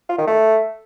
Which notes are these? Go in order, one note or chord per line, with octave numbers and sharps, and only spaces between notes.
F4
D#3
A3